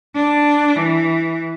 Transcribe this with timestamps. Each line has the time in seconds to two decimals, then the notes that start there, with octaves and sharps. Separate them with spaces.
0.16 D4
0.76 E3